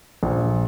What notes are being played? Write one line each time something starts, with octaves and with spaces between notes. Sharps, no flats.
A#1